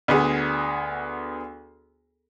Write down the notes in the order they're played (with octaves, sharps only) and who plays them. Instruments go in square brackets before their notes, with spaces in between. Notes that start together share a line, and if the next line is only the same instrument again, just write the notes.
[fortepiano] D2 B3 G#4